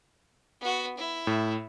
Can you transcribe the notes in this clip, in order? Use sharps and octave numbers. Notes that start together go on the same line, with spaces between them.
B3 F#4
E4
A2